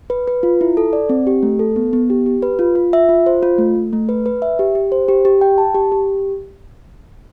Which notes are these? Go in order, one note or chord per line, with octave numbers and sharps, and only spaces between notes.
B4
B4
F4
E4
A4
D5
C4
G4
A3
A4
B3
B3
G4
G4
B4
F4
F4
E5
F4
C5
F4
A3
A3
A3
B4
B4
E5
G4
G4
C5
G4
G4
G5
A5
G4
G4